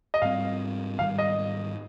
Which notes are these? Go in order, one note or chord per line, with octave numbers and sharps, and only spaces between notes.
D#5
G#2 G3 C4 F5
G#2 D#3 G3 F5
D#5